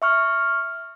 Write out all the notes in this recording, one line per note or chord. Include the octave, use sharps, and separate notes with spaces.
E5 C#6 F6